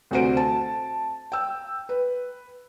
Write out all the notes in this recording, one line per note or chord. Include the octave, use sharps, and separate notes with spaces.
D2 C3 F#4 C5 D7
A5
G5 E6
B4